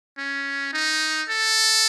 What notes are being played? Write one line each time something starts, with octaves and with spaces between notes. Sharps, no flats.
C#4
D#4
A4